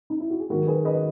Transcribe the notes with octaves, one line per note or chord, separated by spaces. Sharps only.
D#4
E4
F#4
G#4
G#2 D#3 F#3 F#4 A#4
G#4 B4
B4 D#5